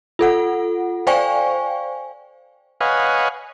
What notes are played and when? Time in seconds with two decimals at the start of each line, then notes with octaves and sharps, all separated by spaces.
0.19 F4 A4 F#5
1.07 C5 D5 F5 G5 G#5 C#6
2.81 B4 C#5 D#5 F5 F#5 G#5